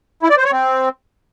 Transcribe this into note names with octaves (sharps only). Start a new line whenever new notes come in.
E4
D5
C5
C#5
C4